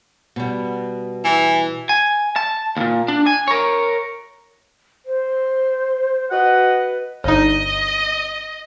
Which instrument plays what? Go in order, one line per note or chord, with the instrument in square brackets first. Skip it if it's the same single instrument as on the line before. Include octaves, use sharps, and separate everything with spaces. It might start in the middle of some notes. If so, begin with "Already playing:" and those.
[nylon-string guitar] B2 G3
[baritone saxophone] E3
[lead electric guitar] G#5
A5
D#2 A#2
D4
G#5
A#4 C#5
[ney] C5
[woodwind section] F#4 D#5 F#5 [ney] B4
[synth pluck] G1 D#4 [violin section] D#5